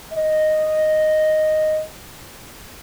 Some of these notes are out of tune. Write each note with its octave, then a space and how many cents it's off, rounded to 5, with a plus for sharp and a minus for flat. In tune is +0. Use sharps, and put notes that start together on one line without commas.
D#5 -5